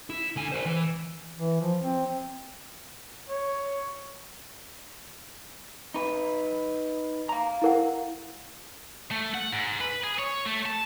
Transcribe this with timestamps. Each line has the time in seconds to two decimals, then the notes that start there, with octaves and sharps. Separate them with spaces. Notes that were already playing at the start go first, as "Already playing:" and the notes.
0.10 E4
0.36 D3 G#5
0.52 A#4 C5
0.66 E3
1.39 E3
1.61 F3
1.80 C4
3.29 C#5
5.94 D#4 B4
7.29 F5 A#5
7.62 E4 A#4 F#5
9.11 A3
9.34 F#5
9.52 G#2
9.80 B4
10.04 G#4
10.19 C#5
10.45 A3
10.66 A5